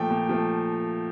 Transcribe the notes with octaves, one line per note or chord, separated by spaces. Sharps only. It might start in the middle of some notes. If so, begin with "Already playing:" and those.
Already playing: A#2 F3 A3 G5
A#2
F3 A3